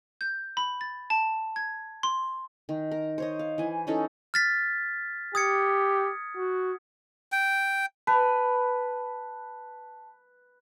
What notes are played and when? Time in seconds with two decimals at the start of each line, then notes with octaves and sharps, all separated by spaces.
0.21 G6
0.57 B5
0.81 A6
1.10 A5
1.56 G#6
2.03 C6
2.69 D#3
2.92 A#4
3.18 C5 C#5 D#5
3.39 F5
3.58 E3 G#5
3.87 E3 C#4 D#4 A4
4.34 F6 A6 B6
5.35 G4 D#6 G#6 C#7
6.36 F#4
7.32 G5
8.07 B4 A5